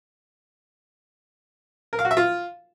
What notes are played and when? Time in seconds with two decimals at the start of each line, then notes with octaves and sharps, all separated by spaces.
1.93 A#4
1.99 F5
2.05 F#4
2.11 E5
2.17 F4